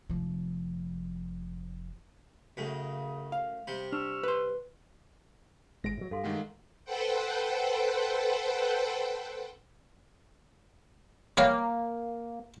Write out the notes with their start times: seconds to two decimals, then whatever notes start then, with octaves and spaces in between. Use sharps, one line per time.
0.09 F1 F3
2.57 F#2 A2 C#3
3.32 F5
3.67 C3 G3
3.92 D4 C#6 E6 F6
4.24 B4 C6
5.84 G#1 G#3 A#6 D7
5.98 A2 F#3
6.11 G2 A4 F5 C6
6.24 D#3 G#3 A3 F#5 D6
6.84 A4 B4 C5 F#5 G5
11.37 G3 A#3 C#5 F5